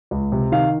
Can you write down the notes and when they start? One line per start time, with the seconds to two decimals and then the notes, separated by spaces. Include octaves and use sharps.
0.11 C#2
0.32 C3
0.52 D#3 F5